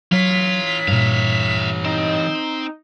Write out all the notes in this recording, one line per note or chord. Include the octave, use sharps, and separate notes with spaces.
E3 F#3 F4 C#5 B6
G2 A#2 E5 F5
C4 D#4